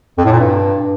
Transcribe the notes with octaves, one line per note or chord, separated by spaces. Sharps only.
F2
A2
A#2
G2